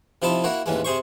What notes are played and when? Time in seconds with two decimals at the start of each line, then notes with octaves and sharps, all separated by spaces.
0.22 C3 F3 D#4 E4 A5
0.44 A#3 E4 F#4
0.66 A1 D#2 E3 G#3
0.84 C3 G#4 C5 C#6